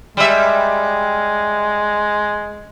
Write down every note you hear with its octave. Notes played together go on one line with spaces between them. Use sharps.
G3 G#3 E5